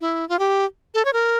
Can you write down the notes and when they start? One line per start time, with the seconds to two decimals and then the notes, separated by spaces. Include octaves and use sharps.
0.01 E4
0.29 F4
0.39 G4
0.94 A4
1.05 C#5
1.13 A#4